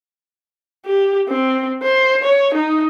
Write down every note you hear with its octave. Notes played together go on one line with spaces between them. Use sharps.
G4
C4
C5
C#5
D#4